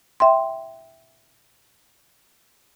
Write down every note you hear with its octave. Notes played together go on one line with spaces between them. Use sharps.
E5 G5 C6